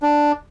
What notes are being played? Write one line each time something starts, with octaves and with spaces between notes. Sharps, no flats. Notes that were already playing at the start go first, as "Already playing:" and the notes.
D4